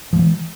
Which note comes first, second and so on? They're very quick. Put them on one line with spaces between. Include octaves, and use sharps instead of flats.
F3 G#3 E3